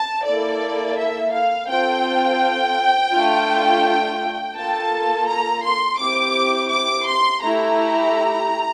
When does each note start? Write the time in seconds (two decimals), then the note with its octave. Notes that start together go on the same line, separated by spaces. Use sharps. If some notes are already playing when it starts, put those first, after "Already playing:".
Already playing: A5
0.25 A#3 E4 A4 D5
0.97 E5
1.32 F5
1.68 C4 F4 A4 G5
3.12 A3 D4 F4
4.56 A#3 F4 A4 A5
5.28 A#5
5.63 C6
5.98 C4 E4 G4 D6
6.70 D6
7.06 C6
7.42 A3 E4 G4 A#5